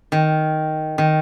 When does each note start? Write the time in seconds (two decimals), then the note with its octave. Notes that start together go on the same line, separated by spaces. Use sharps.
0.12 D#3
0.98 D#3